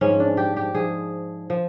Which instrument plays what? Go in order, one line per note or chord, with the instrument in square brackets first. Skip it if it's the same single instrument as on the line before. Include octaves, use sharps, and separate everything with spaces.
[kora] G#2 F3 C#4
D4
G4
G4
G#2 F3 G#4
F3